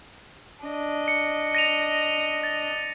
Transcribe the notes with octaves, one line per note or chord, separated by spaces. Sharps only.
D4 D#5
C#7
A#6 D#7 F7
A6